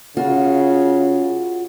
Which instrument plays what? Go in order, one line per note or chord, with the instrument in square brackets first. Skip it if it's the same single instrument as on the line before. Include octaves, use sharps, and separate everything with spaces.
[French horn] C#3 [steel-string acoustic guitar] F4 F#4